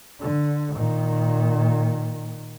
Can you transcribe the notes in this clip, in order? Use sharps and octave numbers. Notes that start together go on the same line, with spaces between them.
D3
A#2 D#3